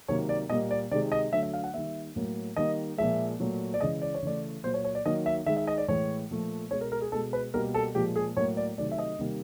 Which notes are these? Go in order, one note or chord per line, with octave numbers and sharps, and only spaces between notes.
C3 D#3 F#3 A#3 C#5
D5
A#2 G3 A#3 D#5
D5
C3 D#3 G#3 D5
D#5
D3 F#3 A3 E5
E5
F5
F#5
D#3 G3 A#3 E5
A2 F#3 A#3
D#3 G3 A#3 D#5
A#2 F3 G#3 E5
A#2 F#3 A3
D5
C#3 E3 G#3 D#5
D5
C#5
C#3 E3 A3 D5
A#2 F#3 A#3 C5
C#5
C#5
D5
D#3 F#3 A#3 D#5
E5
D#3 G#3 E5
E5
D#5
D5
A2 E3 G#3 C#5
A#2 F3 A3
B2 G#3 C#5
A#4
A#4
G#4
B2 G#3 A4
B4
B2 G3 A#3 A#4
A4
A#2 F3 G#3 G4
G#4
A2 F#3 A#3 C#5
D5
C3 D#3 F#3 A3 D5
E5
D#5
C3 D#3 G3 A#3